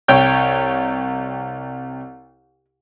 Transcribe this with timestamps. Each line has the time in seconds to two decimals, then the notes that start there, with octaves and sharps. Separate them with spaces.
0.08 C2 C#5 G5